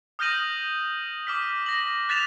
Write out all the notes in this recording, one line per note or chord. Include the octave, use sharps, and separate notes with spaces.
D#6 F6 G6 A#6 D#7 F#7
D6 F6 B6
A#6 F#7
F#6 A6 B6 E7 F7